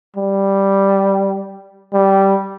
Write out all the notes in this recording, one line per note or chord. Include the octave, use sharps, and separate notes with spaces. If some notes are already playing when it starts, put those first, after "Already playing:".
G3
G3